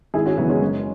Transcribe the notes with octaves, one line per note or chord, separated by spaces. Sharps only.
G#1 E4 G#4
C#4 F#4
F#2 C#3 E3 B3 E4
G#3 C#4
F#1